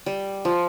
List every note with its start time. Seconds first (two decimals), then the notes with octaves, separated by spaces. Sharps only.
0.06 G3
0.45 F3